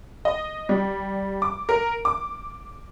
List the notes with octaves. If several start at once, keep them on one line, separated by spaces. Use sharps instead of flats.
D#5
G3
D6
A#4
D6